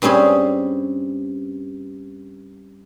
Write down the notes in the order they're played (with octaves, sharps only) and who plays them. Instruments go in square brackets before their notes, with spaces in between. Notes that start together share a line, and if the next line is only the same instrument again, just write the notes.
[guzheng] G2 G3 C4 C#4 G#4